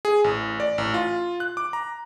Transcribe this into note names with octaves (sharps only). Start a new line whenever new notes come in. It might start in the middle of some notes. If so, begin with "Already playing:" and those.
G#4
A1
D5
A1
F4
F#6
D6
A#5